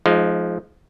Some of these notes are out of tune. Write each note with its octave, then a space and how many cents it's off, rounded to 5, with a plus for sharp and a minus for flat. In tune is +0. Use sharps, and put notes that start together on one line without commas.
F3 +0 G#3 +30 D#4 +0